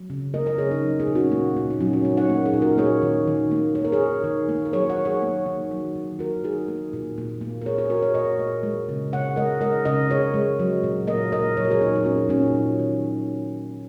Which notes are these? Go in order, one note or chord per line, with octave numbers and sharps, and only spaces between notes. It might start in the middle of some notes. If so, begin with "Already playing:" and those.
Already playing: F#3
C#3
A#3 A#4 D#5
A#4 D#5
C#3 G#4 C#5
D#4
F#3
D#4 G#4
A#2
C#4 F#4
A#3
A#2
D#4
F#3 C#4 F#4
C#4
A#2 D#4
C#5 F#5
A#3
D#4 G#4
A#2
F#4 A#4
A#3 G#4 C#5
D#3
D#3
A#3
A#3 C#5
A#4
G#4 C#5
D#3
D#3
A#3
A#4
F#3 G#4 C#5
C#5 F#5
D#3
G#4 C#5
A#3
D#3
F#3
D#3
A#3 F#4 A#4
D#3 D#4 G#4
A#3
A#2
A#2
A#3
A#4
A#3 G#4 C#5
G#4 C#5
A#2 F#4 A#4
G#4 C#5
A#2 A#4 D#5
A#3
G#3
C#3
C#3 C#5 F#5
G#3 A#4 D#5
G#3 A#4 D#5
C#3 A#4 D#5
C#3 G#4 C#5
G#3
F#3
A#2
A#3 A#4 D#5
A#2 A#4 D#5
F#3 C#5
A#4
G#4 C#5
A#2 D#4 G#4
G#4
A#3 C#4 F#4
D#4
A#2 C#4
D#4
F#3
D#3